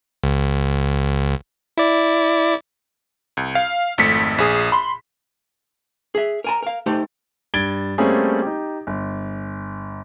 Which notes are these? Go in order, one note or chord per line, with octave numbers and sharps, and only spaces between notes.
C#2
E4 D5
C2
F5
G#1 F2 A3 B6 C#7
A#1 G#4 D#6
B5 C6
G#4 E5
A#4 G#5 A#5
A#4 F5
A3 D#4 G4 C5
G2 G#6 A6 D7 G7
G3 A3 A#3 C4 C#4 G#4
D#4 G4
G1